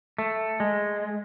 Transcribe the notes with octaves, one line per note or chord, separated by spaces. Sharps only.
A3
G#3